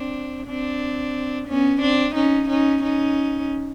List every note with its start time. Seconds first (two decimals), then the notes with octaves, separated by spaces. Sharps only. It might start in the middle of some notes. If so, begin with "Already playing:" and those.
Already playing: C4 D4
0.47 C4 D4
1.48 B3 C#4
1.81 C4 D4
2.15 C#4 D#4
2.49 C#4 D#4
2.83 C#4 D#4